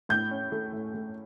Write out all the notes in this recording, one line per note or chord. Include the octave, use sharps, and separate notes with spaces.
A2 G6
C#4
A3
A2
A3